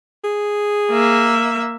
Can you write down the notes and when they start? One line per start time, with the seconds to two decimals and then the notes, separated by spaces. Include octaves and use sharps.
0.25 G#4
0.90 A#3 E5